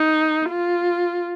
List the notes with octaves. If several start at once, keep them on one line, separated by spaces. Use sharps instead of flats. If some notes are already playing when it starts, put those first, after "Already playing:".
Already playing: D#4
F4